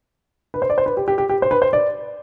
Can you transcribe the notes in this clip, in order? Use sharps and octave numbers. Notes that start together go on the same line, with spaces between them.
B4
C5
D5
C5
B4
G4
G4
G4
G4
C5
B4
C5
D5